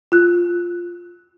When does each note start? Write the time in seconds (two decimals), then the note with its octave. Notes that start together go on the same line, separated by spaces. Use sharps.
0.12 F4 F#6